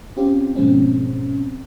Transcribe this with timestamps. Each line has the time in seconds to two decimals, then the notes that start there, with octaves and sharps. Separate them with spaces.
0.17 C4 C#4 F4 G4
0.56 G#2 B2 F3 G#3 C4 C#4